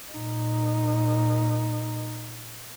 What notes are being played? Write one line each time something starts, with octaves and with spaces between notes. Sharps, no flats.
A#2 D#4